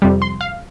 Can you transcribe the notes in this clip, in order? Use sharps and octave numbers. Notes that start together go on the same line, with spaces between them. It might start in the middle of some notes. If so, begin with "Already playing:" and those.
F2 C3 G3
C6
F5